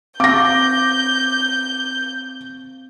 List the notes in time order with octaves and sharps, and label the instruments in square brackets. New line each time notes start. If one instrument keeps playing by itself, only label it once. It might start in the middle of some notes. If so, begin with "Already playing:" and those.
[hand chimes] C4 F5 [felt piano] D6 A#6 [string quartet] G6